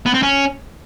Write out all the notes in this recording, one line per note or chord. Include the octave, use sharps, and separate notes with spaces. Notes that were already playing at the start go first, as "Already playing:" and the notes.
B3
C4
C#4